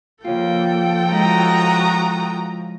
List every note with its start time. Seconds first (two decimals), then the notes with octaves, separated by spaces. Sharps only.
0.24 C#3 F3 A#3 F4 A4 G5
1.11 G#3 E4 F#4 A#5 D#6